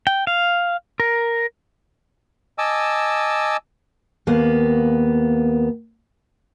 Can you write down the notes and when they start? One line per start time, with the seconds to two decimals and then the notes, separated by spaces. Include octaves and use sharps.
0.07 G5
0.27 F5
1.00 A#4
2.58 D#5 G#5 A5 D6 E6
4.27 D#2 A#3 B3